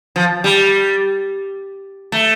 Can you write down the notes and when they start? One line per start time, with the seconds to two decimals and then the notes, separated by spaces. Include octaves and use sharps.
0.16 F3
0.44 G3
2.12 A3